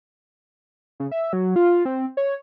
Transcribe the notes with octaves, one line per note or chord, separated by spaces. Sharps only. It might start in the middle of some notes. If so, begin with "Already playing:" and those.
C#3
E5
F#3
F4
C4
C#5